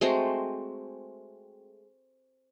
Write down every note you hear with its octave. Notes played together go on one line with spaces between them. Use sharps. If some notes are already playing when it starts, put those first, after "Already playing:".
G#3 A3 C4 F#4